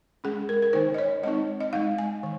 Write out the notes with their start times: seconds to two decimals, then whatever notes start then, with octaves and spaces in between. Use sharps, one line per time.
0.24 G#3 C#4 G#4
0.49 A#4
0.62 A#4
0.73 D#3 A#3 D#4 C5
0.94 D#5
0.98 C#5
1.23 G#3 C4 D#4 D#5
1.61 D#5
1.73 G#3 D#4 F5
1.98 G#5
2.23 D#3